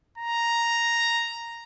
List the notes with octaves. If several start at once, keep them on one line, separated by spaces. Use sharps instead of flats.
A#5